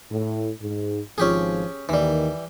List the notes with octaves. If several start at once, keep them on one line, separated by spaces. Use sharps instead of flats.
A2
G#2
G#1 F3 C#4 G4 G#4
D#2 D#3 E3 G3